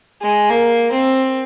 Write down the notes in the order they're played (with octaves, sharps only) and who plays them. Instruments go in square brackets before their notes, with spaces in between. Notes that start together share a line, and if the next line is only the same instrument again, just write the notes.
[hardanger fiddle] G#3
A#3
C4